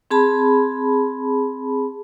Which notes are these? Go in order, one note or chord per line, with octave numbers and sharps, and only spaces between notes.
C4 G#4 A5 B5